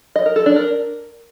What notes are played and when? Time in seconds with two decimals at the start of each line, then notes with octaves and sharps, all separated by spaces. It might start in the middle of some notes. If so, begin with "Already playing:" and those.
0.16 D#5
0.26 A#4
0.36 A4
0.46 D4
0.56 A#4